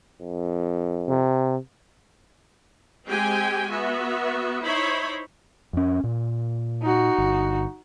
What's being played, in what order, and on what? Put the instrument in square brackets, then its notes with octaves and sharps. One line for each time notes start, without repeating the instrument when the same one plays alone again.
[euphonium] F2
[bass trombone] C3
[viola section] G#3 C4 G4 G5 G#5
B3 F#4 E5
D#4 E4 C5 C#5 B5
[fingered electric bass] F2 C#4
A#2
[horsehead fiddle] D#4 F#4
[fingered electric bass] G1